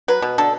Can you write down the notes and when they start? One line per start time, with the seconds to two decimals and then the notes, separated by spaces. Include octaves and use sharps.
0.08 F#3 B4
0.22 B2
0.38 D3 A4